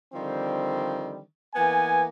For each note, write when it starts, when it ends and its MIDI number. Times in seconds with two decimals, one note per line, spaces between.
0.13 1.21 50
0.13 1.21 51
0.13 1.21 53
0.13 1.21 55
0.13 1.21 60
1.54 2.05 52
1.54 2.05 58
1.54 2.05 59
1.54 2.05 80